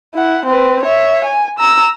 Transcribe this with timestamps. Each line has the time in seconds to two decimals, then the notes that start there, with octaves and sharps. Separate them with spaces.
0.15 E4 F#5
0.46 C4 B4
0.83 C#5 E5
1.25 G#5
1.59 A#5 E6